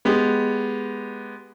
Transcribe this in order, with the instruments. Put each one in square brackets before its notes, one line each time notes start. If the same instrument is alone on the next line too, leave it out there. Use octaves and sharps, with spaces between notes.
[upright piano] G#3 B3 G4